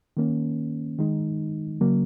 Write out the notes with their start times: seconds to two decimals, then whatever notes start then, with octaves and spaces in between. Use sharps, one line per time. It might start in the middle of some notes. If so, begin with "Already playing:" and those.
0.17 D#3 A#3 C#4
0.99 D#3 G#3 D#4
1.81 C#3 F#3 A#3